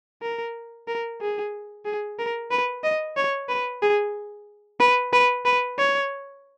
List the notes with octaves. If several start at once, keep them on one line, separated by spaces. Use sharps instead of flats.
A#4
A#4
G#4
G#4
A#4
B4
D#5
C#5
B4
G#4
B4
B4
B4
C#5